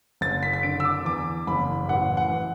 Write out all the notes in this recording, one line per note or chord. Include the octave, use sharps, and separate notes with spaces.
F#1 A6
B6
B6
D3 D7
E6
D6
E2 D6
F#1 B5
A1 F#5
F#5
E3